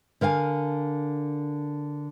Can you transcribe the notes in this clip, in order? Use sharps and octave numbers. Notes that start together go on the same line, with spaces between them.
D3 A#4 F5 G#5